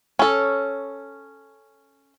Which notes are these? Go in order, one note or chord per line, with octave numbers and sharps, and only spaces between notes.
C#4 A4